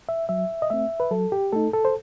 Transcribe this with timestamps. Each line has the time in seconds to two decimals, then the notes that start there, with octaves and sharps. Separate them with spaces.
0.09 E5
0.29 F#3 E5
0.62 D#5
0.70 A3 C4 E5
1.00 B4
1.11 F#3 A4
1.32 G4
1.52 A3 D#4 A4
1.73 A4
1.85 C5